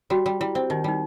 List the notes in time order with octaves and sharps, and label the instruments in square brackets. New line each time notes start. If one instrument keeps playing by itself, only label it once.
[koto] G3 [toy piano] F#4
[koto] G3
[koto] G3 [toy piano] E4
[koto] C4
[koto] D#3 [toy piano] D#4
[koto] G3 [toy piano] D#4